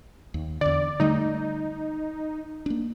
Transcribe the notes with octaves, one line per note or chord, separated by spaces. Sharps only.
D#2
E2 D3 D5
D3 G3 A3 D#4
A#3 D4